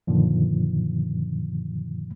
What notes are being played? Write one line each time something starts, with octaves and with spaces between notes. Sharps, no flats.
F#2 A#2 D3 D#3 F3